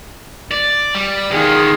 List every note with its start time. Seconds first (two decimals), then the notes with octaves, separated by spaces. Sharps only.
0.51 D5
0.95 G3
1.31 E2 D#3 F4 G#4